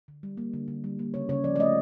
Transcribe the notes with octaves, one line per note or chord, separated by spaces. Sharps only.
D3
G3
A#3
D3
D3
G3
A#3
C#3 C#5
C#3 C#5
F3 D5
D5
A3 D#5